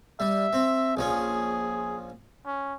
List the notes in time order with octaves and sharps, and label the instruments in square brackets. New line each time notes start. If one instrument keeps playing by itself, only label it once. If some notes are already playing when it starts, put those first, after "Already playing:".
[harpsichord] G3 [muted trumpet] E5
[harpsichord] C4
[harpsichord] A#1 F3 C#4 [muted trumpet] G#4
[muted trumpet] C#4